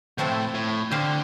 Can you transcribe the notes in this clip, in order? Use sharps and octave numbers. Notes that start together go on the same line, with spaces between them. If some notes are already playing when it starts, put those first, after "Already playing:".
A2 F3 A3 C4 A4 C5
A2
D3 C4 G4 C5 F5